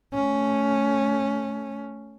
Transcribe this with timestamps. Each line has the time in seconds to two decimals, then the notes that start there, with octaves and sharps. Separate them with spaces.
0.14 A3 C#4